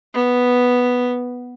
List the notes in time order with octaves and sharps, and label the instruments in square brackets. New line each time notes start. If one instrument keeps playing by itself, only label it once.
[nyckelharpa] B3